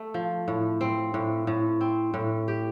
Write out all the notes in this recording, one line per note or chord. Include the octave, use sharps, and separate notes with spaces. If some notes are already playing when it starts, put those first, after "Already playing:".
Already playing: A3
F3
A2
C4
A2
A2
C4
A2
G4